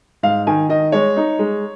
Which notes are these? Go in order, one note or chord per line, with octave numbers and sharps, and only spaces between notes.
G#2 F5
D#3 G#5
D#3 D#5
G#3 C#5
D#4
G#3